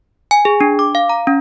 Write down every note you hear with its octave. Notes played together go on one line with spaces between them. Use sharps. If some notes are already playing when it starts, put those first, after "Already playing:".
G#5
G#4
D4
D6
F5
A#5
C#4